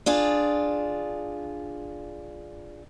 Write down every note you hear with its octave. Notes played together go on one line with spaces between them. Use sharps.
D4 F4 G#4